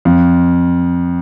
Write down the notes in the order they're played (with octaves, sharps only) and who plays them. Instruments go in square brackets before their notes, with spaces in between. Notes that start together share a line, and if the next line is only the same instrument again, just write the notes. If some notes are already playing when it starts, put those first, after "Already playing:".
[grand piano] F2